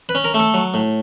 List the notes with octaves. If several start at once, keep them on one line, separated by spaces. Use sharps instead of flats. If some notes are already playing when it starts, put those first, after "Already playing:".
B4
C#4
A#4
A3
A4
F#3
A2